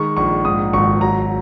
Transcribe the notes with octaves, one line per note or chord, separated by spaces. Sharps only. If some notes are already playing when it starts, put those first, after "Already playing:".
Already playing: D#3 G#3 C#6
A#1 C#6
G#2 D#6
G#1 C#6
F#3 A#5